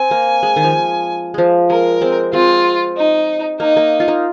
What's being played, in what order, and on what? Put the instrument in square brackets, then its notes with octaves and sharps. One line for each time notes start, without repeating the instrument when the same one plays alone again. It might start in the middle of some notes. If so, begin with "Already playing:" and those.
Already playing: [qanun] C4 [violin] G#5
[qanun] A#3
G#3
D#3
F3
F3 G#3
[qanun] G#3 [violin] A#4
[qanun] G#3 C4
[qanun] G#3 C4 [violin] F4
[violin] D#4
[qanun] A#3 [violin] D#4
[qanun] A#3
F4
A#3 D#4